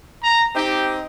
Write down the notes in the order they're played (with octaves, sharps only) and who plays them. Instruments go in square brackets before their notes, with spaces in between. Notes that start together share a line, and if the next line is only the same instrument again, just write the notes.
[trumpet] A#5
[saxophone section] C4 D#4 [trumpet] G4